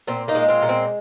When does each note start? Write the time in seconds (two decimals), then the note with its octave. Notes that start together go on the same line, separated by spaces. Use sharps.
0.07 A#2 C4
0.28 A#3 D#4
0.35 G#3
0.48 C4 F4
0.62 A#2
0.69 C4